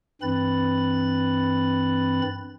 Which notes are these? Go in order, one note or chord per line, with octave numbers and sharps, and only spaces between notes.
G2 E3 C4 B4 B5 A6